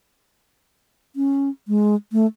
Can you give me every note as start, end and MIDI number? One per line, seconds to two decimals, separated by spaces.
1.16 1.49 61
1.68 1.95 56
2.12 2.26 57